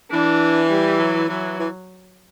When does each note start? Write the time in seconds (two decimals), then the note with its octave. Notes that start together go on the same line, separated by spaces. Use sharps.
0.11 E3 D4
0.70 G3
0.99 F#3
1.29 E3 F#3
1.58 E3